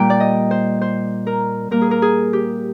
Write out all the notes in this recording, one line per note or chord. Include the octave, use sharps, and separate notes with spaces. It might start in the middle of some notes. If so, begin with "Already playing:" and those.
Already playing: A#2 G3 A#3 G5
D5
D#5
C5
C5
A#4
A#2 G3 A#3 A#4
G#4
A#4
G#4
G4